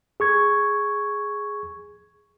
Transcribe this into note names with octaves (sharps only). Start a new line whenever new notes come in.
G#4 C#6 G#6